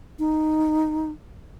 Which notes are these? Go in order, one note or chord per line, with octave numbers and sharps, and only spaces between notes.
D#4